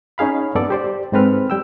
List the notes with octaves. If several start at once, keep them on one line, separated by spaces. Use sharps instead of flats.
C#4 D#4 G#4 F5 B5
G2 B3 A4 D5
G4 C5 D5
G#2 G#3 C4 A4 B4 F6
G3 G5 E6